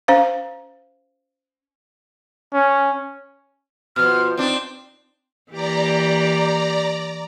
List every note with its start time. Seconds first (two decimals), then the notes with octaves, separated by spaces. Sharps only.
0.08 C#4 C5 F5
2.53 C#4
3.96 B2 F3 F6
4.37 C4 D4 D#4
5.52 E3 A#3 G4 D5 A#5